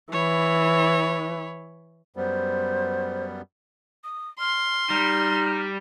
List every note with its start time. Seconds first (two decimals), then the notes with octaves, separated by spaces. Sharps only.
0.12 E3 C#5 B5
2.16 F#2 G3 B3 C5
4.04 D#6
4.40 C6 F6
4.90 G3 D#4 F6